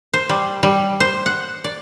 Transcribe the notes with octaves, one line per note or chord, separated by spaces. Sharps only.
C5
G3
G3
C5
F#5
D5